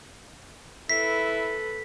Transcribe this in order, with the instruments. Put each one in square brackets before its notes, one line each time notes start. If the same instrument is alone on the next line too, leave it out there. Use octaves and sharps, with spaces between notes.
[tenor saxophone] E4 [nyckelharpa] A4 B4 [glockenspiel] B6